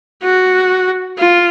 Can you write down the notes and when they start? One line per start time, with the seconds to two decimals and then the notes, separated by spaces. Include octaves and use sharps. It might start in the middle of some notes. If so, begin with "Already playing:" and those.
0.23 F#4
1.18 F4